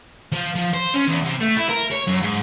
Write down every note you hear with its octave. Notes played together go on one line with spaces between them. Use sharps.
F3
F3
C5
C#4
E2
C3
A3
E4
A#4
C#5
F#2
G#2